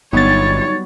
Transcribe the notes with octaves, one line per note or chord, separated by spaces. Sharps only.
G1 F#3 G3 B3 D#4 C#5 A6